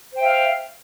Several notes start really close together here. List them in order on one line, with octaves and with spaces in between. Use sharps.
C5 G5 E5 F5